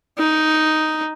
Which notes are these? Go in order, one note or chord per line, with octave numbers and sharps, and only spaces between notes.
D#4